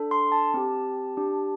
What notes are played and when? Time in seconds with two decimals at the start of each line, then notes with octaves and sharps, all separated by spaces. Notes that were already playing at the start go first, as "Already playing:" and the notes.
Already playing: D4 A4
0.11 C6
0.32 A5
0.54 C4 G4
1.17 D4 G4